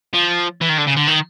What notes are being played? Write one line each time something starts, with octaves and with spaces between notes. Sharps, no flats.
F3
E3
D#3
D3
C#3
D3
D#3